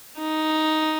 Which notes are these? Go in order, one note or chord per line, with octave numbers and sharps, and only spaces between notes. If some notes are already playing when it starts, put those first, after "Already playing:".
D#4